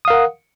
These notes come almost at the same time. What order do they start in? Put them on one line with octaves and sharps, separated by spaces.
D#6 F5 A#4 F#5